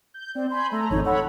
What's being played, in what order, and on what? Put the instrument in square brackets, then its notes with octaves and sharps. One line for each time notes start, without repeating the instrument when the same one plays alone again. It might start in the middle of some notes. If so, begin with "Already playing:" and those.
[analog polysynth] G6
[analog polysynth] C4 [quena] D5
[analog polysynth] G#5 B5 G6 [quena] C6
[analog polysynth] A3 A#5 [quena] A4
[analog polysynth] G#1 F2 D#4 [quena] C#5
[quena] A4 [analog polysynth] C#5 F#5 B5